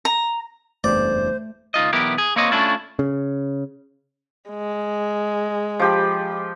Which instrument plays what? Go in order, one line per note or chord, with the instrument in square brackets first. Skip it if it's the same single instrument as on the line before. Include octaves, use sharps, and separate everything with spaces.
[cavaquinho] A#5
[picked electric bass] F#1 E2 G2 [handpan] A3 [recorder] C5 [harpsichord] D5
[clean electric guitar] C#2 D#4 F4 D#5
B1 E2 B3 E4 G4 A#4
G#4
A#3 C4 C#5 D#5
A3 C#4 D4 E4 F4
[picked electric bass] C#3
[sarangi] G#3
[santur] F3 G4 B5